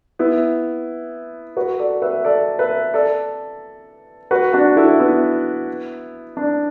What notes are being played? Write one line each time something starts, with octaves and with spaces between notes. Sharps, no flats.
B3 E4
F#4 B4
A4 D5
B4 E5
A4 D5
B4 E5
A4 D5
F#4 B4
D4 F#4
E4 A4
B3 E4
D4